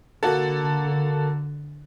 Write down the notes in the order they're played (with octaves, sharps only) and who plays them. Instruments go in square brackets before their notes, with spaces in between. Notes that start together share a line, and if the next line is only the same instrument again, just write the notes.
[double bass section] D3 [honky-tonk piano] A#3 F#4 A4